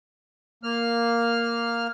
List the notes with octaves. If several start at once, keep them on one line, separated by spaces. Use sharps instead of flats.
A#3 F6